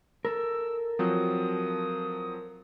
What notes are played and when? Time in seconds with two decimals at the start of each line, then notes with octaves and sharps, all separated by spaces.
0.25 A4 A#4 E6
0.99 F3 F#3 C4 D#6